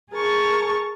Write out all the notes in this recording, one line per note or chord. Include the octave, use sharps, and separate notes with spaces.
G#4 A#4 A5 C#6